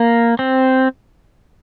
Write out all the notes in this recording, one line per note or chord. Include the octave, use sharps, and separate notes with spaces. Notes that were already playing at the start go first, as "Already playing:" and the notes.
Already playing: A#3
C4